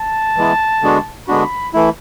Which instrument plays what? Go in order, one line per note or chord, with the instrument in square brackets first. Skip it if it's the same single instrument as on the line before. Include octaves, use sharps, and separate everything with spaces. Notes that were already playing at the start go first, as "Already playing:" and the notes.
Already playing: [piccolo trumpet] A5
[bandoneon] E3 G#3 B3 E4
D3 G#3 B3 D4 F#4
[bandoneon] D3 G#3 B3 D4 F#4 [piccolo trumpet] B5
[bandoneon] E3 A3 E4